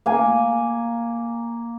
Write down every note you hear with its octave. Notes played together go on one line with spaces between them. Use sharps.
A#3 G#5